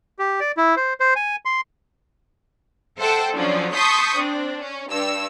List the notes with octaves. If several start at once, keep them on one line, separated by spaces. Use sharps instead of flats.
G4
D5
E4
C5
C5
G#5
C6
A4 C5 E5 F#5 G5 A5
D3 F3 F#3 C#4 D4
A5 C6 C#6 D#6 G6 B6
C4 D4
C#4
G2 E6